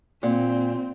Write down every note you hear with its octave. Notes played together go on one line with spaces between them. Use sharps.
A#2 C4